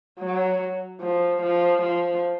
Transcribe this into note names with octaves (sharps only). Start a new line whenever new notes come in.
F#3
F3
F3
F3